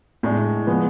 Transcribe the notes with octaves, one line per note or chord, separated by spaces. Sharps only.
A2 G#3 D4
F3 G#3 B3